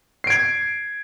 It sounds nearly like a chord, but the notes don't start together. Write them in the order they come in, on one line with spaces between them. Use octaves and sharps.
C7 D7 G#6